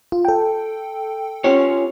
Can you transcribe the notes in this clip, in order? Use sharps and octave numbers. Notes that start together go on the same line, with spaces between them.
F4
A4 G5
C#4 F4 G4 C#5